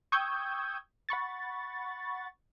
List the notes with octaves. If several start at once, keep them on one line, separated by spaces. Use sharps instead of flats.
G5 C#6 D#6 E6 G6 G#6
F#5 B5 C#6 A6